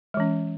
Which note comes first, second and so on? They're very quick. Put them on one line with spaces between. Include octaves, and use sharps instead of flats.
G#3 E3 C#4